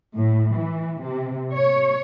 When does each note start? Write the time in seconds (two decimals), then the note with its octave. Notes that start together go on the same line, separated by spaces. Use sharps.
0.15 A2
0.54 E3
1.01 C3
1.54 C#5